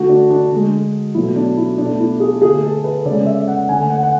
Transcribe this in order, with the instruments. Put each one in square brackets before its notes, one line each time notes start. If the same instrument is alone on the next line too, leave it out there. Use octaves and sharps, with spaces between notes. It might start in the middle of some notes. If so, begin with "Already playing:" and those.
Already playing: [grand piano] D3 A3 F#4
D4
D4
D3 G#3
B2 F#3 A3 E4
D4
E4
B2 A3 D4
E4
G#4
D3 A3 G#4
A4
B4
C#3 G#3 D5
E5
F#5
D3 A3 G#5
F#5
F#5